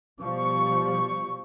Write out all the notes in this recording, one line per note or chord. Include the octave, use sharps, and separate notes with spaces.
B2 F3 G3 C#6